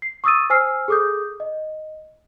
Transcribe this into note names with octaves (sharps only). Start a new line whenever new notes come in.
C7
C#6 D#6 E6 A6 D#7
C5 G#5 E6 F6 C7
G#4 A4 D6 D#6 G6
D#5